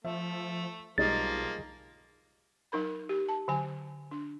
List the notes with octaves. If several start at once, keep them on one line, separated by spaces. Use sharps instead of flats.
F3 A3 E5
B1 F3 G3 G#3 A#3 D#4 A6
F#3 D#4 A#4 B5
G4
A5
D3 F#3 G#5
D4